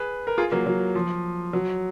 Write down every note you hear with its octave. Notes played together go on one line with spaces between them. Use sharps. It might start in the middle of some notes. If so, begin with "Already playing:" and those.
Already playing: G#4 B4
A#4
F4 G#4
F#3 A#3
F#3
F3
F#3